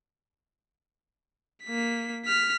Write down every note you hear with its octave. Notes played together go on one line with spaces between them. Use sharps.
A#3 B6
F6 B6